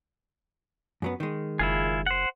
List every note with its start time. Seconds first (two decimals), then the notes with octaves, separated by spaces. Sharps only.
1.02 F#2 F#3 B3
1.20 D#3 G#3
1.59 F#1 E4 F4 G#4
2.06 C5 F#5